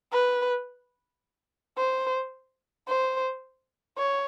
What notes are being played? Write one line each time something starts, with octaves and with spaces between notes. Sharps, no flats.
B4
C5
C5
C#5